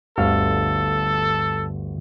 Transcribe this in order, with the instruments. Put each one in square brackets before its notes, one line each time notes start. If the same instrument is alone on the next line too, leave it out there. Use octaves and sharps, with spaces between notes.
[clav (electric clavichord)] G1 D2 F5 [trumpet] A4